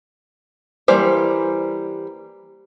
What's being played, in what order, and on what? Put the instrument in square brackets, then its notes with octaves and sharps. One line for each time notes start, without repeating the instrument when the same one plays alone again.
[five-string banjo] E3 G3 A#3 C5